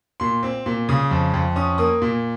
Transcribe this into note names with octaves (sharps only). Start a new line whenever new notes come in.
A#2 C6
C4
A#2
C#3 D#6
F2
F2
C#4 D#6
A#3 D#6
A#2